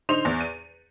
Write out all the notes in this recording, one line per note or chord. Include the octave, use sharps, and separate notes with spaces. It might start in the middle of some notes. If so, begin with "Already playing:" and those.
D3 D#4 C5 C6 F7
E2
D#7